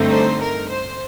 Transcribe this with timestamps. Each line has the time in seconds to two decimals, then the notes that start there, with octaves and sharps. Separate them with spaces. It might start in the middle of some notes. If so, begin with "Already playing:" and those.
Already playing: G2 D3 A3 C4 D#4
0.14 C5
0.42 A#4
0.71 C5